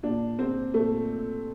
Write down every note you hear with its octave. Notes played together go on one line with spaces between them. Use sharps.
A#2 D4
C4
A#2 A3